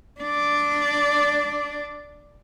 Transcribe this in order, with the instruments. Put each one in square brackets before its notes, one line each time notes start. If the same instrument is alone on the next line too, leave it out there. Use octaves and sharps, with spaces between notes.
[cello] D4 D5